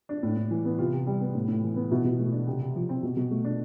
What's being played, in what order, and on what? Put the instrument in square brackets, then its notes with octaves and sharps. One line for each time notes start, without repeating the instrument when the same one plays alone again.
[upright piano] D4
A2
A2
E3
B3
C3 F4
C3
G3
B3
A2
A2
E3
B3
B2 E4
B2
A3
D4
C3
C3
F3
C4
B2
B2
A3
D4